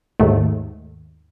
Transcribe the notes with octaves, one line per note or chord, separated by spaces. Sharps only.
D#2 G#2 D#3 A3